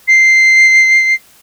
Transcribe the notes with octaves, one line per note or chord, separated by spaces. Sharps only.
C7